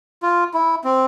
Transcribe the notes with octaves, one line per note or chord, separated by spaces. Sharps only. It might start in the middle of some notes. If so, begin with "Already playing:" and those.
F4
E4
C4